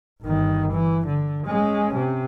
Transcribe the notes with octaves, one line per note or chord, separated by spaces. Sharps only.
G1 D#3
E3
D3
G#3 C#4
C3